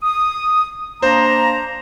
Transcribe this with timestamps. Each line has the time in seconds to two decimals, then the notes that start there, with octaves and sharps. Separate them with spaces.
0.02 D#6
1.02 A#3 D4 C5 A#5